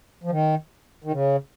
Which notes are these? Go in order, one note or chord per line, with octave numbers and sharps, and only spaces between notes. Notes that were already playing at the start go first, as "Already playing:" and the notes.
F3
D#3
D#3
C#3